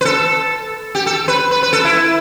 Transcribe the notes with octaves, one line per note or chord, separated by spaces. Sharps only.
B4
A4
G4
A4
B4
B4
B4
A4
E4